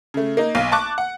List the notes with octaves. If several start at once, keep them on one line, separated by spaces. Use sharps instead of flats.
C#3 A3
A#3 D#4
B1 F5
A5 C#6 D6 F#6
F#5